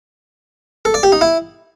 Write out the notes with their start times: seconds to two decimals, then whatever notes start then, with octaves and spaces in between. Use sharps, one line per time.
0.85 A4
0.94 D5
1.03 G4
1.12 D#4
1.21 E4